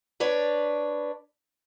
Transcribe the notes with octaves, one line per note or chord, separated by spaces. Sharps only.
D4 B4 C#5 D5